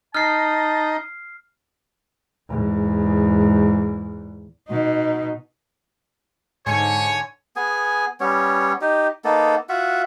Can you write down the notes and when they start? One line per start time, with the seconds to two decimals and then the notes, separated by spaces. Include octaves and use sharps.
0.15 D#4 A5 A#5 F6 C7
2.48 E2 G#2
4.68 B2 D#4
6.66 G#2 D3 C#5 G#5 C#6
7.56 B3 G#4 G#5
8.20 G3 B3 C#4 C#5
8.81 D#4 G4
9.24 A#3 B3 D#4 A4
9.69 F4 F#4 E5 F#5